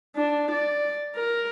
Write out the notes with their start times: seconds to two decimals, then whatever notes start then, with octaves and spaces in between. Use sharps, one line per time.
0.16 D4
0.51 D5
1.16 A#4